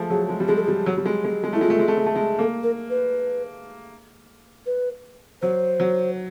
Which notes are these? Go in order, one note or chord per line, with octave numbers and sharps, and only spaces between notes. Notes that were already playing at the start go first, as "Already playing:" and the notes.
Already playing: F3 G#3 A3
F#3 G#4
G#3
G3
G#3 G#4
A4
G#4
G3
F#3
G3
G#3
G#3
G#3
A3 E4
G#3 F4
A3
G#3
A3
G#3
A3
G#3
A#3 A4
A#4
B4
B4
F#3 C5
F#3